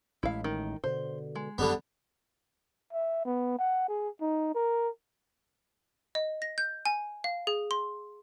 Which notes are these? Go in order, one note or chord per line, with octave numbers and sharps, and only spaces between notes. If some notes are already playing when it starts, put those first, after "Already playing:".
A1 A2 G#3 E4 F5
D#3
B2 D3 C5
G#3
F#2 D3 G3 B3
E5
B3
F#5
G#4
D#4
A#4
D#5
A#6
G6
G#5
F5
G#4
C6